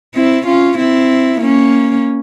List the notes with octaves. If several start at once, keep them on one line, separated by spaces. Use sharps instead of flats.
C4 E4
C#4 F4
C4 E4
A#3 C#4